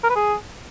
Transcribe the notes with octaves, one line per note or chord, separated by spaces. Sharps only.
A#4
B4
G#4